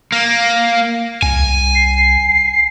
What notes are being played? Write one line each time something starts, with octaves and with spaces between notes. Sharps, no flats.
A#3
C2 G#5
C7